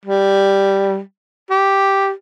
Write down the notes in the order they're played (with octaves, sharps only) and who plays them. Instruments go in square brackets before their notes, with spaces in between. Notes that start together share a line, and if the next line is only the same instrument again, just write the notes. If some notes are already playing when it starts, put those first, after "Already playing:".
[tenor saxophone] G3
G4